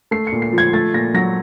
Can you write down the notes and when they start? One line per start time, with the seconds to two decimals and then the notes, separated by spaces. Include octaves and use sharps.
0.11 A3 C7
0.27 C#7
0.32 A#2
0.42 C7
0.53 F3
0.58 G#6
0.73 A3 A6
0.94 A#2 A#6
1.14 F#3 A#6